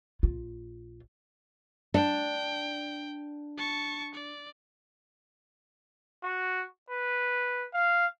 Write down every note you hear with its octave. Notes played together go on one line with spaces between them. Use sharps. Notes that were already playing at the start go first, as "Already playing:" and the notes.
A#1 F4
D4 G5
A5 C#6
D5
F#4
B4
F5